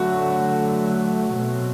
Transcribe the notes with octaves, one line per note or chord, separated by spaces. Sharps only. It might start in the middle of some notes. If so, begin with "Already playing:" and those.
Already playing: D3 F#3 A3 F#4
B2 F#3 A3 C4